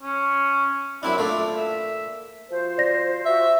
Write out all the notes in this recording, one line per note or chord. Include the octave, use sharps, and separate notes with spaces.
C#4
F#2 C4 D4 E4
A#2 F3 A3 D4
E5
F3 F#4 C5
D5 A#6
F4 F#4 E5